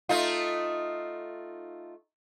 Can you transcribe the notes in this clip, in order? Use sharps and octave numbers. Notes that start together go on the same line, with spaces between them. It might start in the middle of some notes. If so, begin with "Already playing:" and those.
A3 D#4 F4